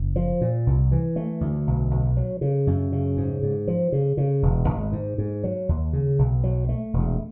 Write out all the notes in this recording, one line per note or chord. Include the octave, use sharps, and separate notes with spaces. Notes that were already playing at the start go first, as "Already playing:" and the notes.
Already playing: F#1
F3
A#2
C2
E3
A3
D2
B1
B1
F#3
C#3
F#2
C#3
G#2
G#2
F3
C#3
C#3
E1
G#1
G#2
G#2
F#3
D#2
C#3
B1
F#3
A3
E1